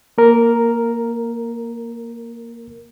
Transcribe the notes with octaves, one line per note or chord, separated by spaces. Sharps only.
A#3 A#4